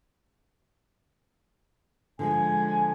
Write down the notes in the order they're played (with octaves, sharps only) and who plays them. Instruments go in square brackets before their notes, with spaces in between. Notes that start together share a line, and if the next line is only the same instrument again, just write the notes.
[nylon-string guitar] D3 F3 G#3 [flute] G#5